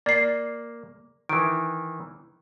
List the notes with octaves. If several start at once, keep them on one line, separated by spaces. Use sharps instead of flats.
A#3 D5 C7
D#3 E3 D7